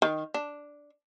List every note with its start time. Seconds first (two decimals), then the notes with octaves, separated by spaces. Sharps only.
0.02 D#3
0.34 D4